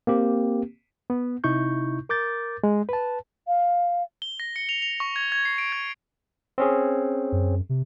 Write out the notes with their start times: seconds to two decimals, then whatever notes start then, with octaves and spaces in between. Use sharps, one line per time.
0.07 A#3 C4 G4
1.10 B3
1.44 C3 D#4 E4 C#6 G6
2.09 A#4 D6 G6 A6
2.64 G#3
2.89 B4 A5
3.47 F5
4.22 G7
4.40 A#6
4.56 C#7
4.69 F7
4.82 F7
5.00 C#6
5.16 G#6
5.32 G#6
5.45 C7
5.58 D7
5.72 G#6
6.58 C4 C#4 G#4
7.32 F#2
7.69 C3